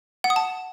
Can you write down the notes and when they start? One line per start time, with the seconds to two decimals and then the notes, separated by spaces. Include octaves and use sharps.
0.24 F#5
0.30 D#6
0.36 A5